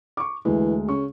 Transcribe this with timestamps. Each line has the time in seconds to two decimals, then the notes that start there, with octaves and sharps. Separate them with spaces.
0.17 C#6 D6
0.45 D2 E3 G#3
0.89 C#3 C#6